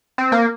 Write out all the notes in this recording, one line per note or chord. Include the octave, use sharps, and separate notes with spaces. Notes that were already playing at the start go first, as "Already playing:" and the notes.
C4
A#3